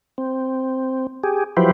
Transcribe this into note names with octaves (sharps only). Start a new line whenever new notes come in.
C4
G4 G#4
F3 F#3 E4 G4 B4 C5